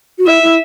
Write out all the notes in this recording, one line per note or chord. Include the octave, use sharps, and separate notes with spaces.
F#4
E4 E5
E4